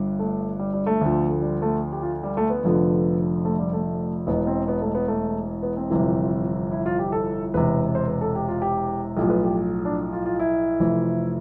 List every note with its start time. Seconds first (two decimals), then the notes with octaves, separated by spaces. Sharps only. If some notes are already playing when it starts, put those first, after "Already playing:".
Already playing: G1 G2
0.19 A3
0.59 G3
0.74 G3
0.86 A3
1.01 D2 D3 F3
1.42 G3
1.62 A3
1.92 G4
2.02 F4
2.23 G3
2.37 A3
2.50 B3
2.64 F1 F2 D3 F3
3.45 A3
3.59 G3
3.73 A3
4.27 E1 E2 B2 B3
4.47 C4
4.68 B3
4.81 A3
4.95 B3
5.08 A3
5.63 B3
5.77 C4
5.90 G1 F2 C3 E3
6.71 E4
6.86 F4
6.99 G4
7.12 A4
7.54 E1 E2 C3 B4
7.95 C5
8.08 B4
8.21 A4
8.35 G4
8.48 F4
8.62 G4
9.17 B1 A2 F3 G4
9.30 B4
9.44 G4
9.85 D4
10.13 F4
10.26 F4
10.40 E4
10.80 F1 F2 E3